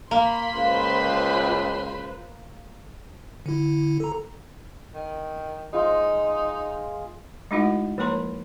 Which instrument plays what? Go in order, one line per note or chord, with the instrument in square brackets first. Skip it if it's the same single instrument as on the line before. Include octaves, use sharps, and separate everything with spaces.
[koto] A#3 [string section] B5 C6
[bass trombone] C#2 [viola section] F4 B4 C5
[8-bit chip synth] D3 E4
A4 A#5
[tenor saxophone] D#3
[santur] G#3 F4 D#5 [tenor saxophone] D#4
[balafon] G#3 A3 D#4 E4 F#4 F#5
F3 A#3 A#4 C#5 A#5 C6